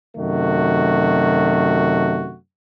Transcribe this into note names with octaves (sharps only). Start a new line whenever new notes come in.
F#2 C3 D#3 A3 F#4